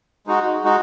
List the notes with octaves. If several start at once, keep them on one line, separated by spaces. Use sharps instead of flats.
G#3 D#4 F#4
G#3 D#4 F#4